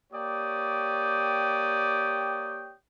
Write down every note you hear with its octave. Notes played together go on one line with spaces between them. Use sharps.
A#3 G4 C#5 D5 G5 D#6